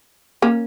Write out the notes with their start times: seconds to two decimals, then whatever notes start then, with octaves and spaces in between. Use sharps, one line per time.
0.42 A#3 C#4